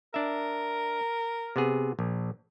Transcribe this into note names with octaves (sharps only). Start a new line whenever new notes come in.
D4 A#4 E5
C3 B3 G#4
A#1